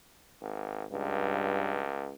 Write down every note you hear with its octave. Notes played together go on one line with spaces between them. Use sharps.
G#1
C#2 G2